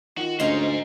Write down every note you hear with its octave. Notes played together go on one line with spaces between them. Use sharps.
D#3 F4 F#4
D2 G#3 C#4 D#4 F4 C5